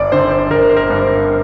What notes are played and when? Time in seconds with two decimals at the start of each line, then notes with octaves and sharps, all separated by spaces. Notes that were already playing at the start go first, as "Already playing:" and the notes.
Already playing: G1 D5
0.12 D3 C5
0.31 C5
0.50 G1 A#4
0.69 C5
0.77 A#4
0.90 G2
1.02 C5